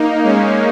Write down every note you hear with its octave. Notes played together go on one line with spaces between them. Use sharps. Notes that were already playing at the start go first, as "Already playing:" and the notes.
Already playing: A#3 D#4
G#3 C#4